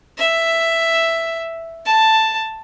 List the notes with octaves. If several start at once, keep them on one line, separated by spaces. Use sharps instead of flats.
E5
A5